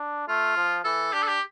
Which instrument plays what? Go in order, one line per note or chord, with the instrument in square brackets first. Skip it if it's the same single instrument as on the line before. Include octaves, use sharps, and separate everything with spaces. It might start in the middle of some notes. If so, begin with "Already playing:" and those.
Already playing: [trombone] D4
[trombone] A3 [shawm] F4
[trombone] F3
[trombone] E3 [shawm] A4
[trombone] D4 [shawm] G4
[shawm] A4
G4